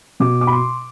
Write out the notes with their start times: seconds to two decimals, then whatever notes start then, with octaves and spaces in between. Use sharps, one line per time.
0.20 B2 D6
0.41 D6
0.47 B5
0.52 C6